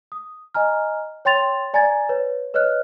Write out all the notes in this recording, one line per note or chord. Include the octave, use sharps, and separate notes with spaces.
D#6
D#5 G#5 A#5 F6
C#5 G5 C6 A6 F7
D5 G#5 A#5 G#6 A6
B4 C#5
B4 C#5 D#5 F6 F#6